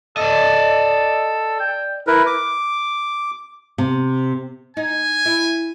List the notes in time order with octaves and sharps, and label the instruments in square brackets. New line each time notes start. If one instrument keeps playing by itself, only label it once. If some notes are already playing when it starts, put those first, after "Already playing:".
[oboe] A4 [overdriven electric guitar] D5 D#5
[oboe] G5
[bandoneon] E4 A#4 B4
D6
[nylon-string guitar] C3
[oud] D#4 [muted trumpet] G#5
[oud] E4